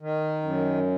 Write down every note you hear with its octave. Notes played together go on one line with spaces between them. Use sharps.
D#3
F#2